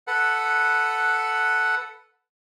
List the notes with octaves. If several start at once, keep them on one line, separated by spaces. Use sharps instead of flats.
A4 B4 F#5